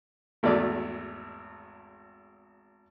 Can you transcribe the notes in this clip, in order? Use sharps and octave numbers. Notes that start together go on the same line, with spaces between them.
G#1 E2 B2 A3 D5